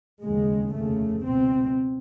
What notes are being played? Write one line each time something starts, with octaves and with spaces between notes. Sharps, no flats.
F1 D#2 C#3 G#3
F1 D#2 C#3 A3
C#2 B2 C4